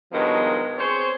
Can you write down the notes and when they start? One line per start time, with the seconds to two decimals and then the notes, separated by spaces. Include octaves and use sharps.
0.13 G2 B2 D#3 F3 F#3 G#3
0.78 C4 G#4 C5 C#5